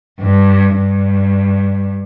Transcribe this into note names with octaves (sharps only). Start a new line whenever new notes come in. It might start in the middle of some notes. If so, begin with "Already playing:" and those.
G2
G2